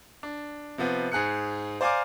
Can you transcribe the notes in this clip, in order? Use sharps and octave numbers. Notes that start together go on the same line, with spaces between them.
D4
C3 F3 B3
G#2 G#4 F#6 C#7
C5 D5 F5 G#5 A#5 D6